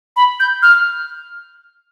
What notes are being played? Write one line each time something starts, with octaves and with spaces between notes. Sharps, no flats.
B5
G6
F6